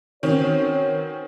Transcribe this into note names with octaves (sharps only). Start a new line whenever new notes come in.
D#3 C4 C#4 F#4 B4 C#5